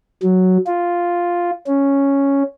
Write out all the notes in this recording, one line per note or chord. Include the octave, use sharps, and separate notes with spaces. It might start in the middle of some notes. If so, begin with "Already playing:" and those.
F#3
F4
C#4